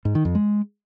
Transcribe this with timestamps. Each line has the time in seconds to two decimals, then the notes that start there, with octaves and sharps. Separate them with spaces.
0.05 G#2
0.15 D#3
0.25 F2
0.35 G#3